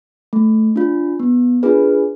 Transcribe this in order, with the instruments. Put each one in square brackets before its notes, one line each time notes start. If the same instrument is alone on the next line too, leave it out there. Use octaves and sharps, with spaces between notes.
[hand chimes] A3
D4 F4
B3
D4 F4 G#4 B4